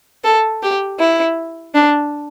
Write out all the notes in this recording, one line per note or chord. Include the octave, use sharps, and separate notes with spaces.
A4
G4
E4
D4